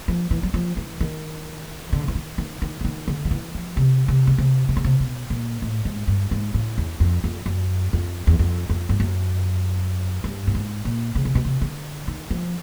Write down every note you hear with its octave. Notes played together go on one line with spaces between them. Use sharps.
F3
E3
F#3
F3
E3
D#3
D3
E3
D#3
D#3
D#3
E3
D#3
D3
F3
E3
F3
C3
C3
C#3
C3
C3
C#3
C3
B2
A#2
A2
G#2
G2
G#2
A2
E2
F2
F2
F#2
F2
E2
F2
F2
G2
F#2
G2
A2
G#2
A#2
C#3
C3
B2
C3
D3
D#3
F3